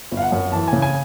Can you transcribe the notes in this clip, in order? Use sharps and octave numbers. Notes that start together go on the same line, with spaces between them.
G1
F5
F#5
F#2
E3 A5
G#5
C#3
G#5